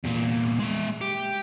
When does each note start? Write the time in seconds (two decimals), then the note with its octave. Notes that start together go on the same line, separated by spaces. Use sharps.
0.04 E2 A#2
0.60 G#3 E5
1.01 G4